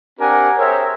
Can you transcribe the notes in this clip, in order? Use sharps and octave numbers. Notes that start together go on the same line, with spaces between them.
C4 D4 G4 A#4 F#5 G#5
G#4 A#4 C5 C#5 E5 G5